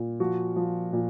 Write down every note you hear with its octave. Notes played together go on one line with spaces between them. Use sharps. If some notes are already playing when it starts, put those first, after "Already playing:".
Already playing: A#2
F3 F#4
F3
A#2